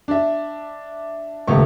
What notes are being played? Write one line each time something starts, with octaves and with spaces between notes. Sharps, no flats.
D4 E5
D#1 C#2 A3 C#6